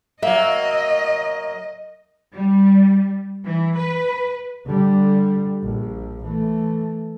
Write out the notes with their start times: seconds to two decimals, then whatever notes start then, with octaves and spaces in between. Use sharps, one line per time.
0.23 F#3 A#3 D#5 E5
2.34 G3
3.45 E3
3.77 B4
4.66 D3 G3
5.63 A#1
6.26 E3 A3